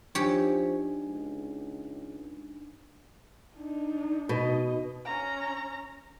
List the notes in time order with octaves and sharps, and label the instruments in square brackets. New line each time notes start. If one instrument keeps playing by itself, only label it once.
[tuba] F3 [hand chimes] D4 D#4 G#5 [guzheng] G4 C#5
[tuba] C#2
[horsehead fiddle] D4 D#4
[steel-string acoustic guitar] B2 [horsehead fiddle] D#4 D#5
[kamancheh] C#4 A#5